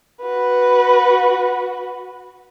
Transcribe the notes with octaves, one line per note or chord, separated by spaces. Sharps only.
F#4 B4